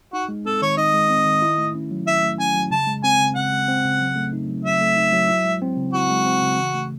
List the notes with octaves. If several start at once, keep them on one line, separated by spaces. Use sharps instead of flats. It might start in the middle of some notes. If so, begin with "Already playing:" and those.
D#4 F#4
G#3
C4 A4
D#3 C#5
D#4 D#5
G#3
C4
D#3
E4
A3
C#4
F#3
E4 E5
A3
C#4 G#5
F#3
C#3 A5
G#3
C4 G#5
C#3
C#3 F#5
G#3
C4
C#3
F#3
A3
D#4
F#3
F#3 E5
A3
D#4
F#3
E4
G#3
C4
C#3
E4 F#4
G#3
C4
C#3
E3
A3